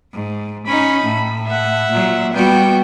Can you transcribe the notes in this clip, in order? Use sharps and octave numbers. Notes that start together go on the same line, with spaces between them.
G#2
C#4 D#4 B5
A2
E5 F#5
A#2 F#3
G3 B3 F#4 G5